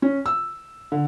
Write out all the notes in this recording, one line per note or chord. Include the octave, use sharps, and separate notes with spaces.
C#4
E6
D3